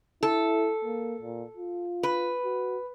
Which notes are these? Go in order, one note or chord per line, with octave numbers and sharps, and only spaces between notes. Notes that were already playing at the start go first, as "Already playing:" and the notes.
E4 A4
A#3
A#2
F4
B4
F#4